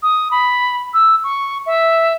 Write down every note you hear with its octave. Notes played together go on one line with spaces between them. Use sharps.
D#6
B5
E6
C#6
E5